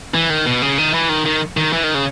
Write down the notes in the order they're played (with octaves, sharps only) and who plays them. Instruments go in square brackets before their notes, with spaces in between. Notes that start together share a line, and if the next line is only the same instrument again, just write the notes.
[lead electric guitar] E3
D#3
B2
C#3
D#3
E3
D#3
D#3
D#3
E3
D#3
C#3